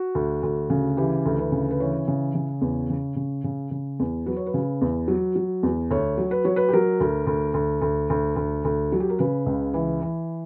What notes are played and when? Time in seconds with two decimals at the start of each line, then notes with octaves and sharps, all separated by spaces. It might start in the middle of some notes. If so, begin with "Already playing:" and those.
Already playing: F#4
0.15 D2
0.43 D2
0.70 C#3
0.97 E3 G4
1.26 D2
1.38 B4
1.52 C#3
1.71 B4
1.80 E3 C#5
2.08 C#3
2.35 C#3
2.61 E2
2.90 C#3
3.16 C#3
3.44 C#3
3.71 C#3
3.99 E2
4.26 F#3 B4
4.36 C#5
4.46 B4
4.54 C#3
4.81 E2
5.08 F#3
5.36 F#3
5.63 E2
5.91 D2 C#5
6.18 F#3
6.31 B4
6.44 F#3 C#5
6.56 B4
6.69 G4
6.73 F#3 A#4
7.00 D2
7.27 D2
7.54 D2
7.82 D2
8.10 D2
8.36 D2
8.65 D2
8.92 F#3
9.00 G4
9.09 A#4
9.18 C#3 B4
9.46 C#2
9.74 E3
10.02 E3